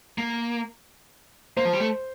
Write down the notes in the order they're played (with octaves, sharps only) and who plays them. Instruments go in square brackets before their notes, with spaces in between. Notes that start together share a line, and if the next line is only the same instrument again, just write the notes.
[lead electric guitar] A#3
[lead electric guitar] A#3 [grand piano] C5
[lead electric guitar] F3
G3
A3